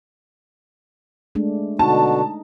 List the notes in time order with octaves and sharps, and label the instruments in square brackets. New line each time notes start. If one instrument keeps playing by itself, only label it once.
[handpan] G#3 A3 D4
[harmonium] B2 D3 F#4 [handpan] D#4 [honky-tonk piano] A5